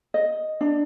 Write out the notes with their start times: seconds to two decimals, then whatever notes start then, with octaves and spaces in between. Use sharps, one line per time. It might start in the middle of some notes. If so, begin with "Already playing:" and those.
0.14 D#5
0.61 D4